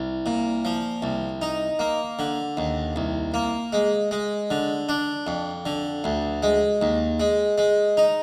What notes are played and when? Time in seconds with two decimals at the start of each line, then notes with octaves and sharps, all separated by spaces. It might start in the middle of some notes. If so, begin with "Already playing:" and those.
Already playing: C2
0.26 A#2
0.65 F3
1.02 C2
1.42 D#4
1.79 A#3
2.19 D3
2.57 D#2
2.96 C2
3.34 A#3
3.73 G#3
4.11 G#3
4.50 D3
4.89 D4
5.27 F2
5.66 D3
6.04 D2
6.43 G#3
6.81 D#2
7.20 G#3
7.58 G#3
7.97 D#4